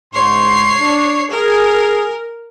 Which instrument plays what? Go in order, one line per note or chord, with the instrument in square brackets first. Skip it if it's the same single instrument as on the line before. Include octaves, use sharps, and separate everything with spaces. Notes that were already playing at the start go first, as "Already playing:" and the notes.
[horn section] G#2 C6 [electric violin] C#5 C7
[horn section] D4
[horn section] G#4 [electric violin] A#4